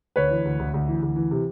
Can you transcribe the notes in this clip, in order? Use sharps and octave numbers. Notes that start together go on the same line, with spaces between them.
D2 B4 C#5
E3
D2
D2
D2
E3
D2
E3
C3